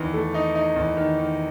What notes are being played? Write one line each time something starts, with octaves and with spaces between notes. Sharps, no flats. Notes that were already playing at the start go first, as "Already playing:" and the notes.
Already playing: E2 D#3
A3
D#4
D#4
E2
D#3
D#3